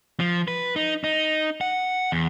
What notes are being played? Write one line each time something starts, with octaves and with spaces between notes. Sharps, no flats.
F3
B4
D#4
D#4
F#5
E2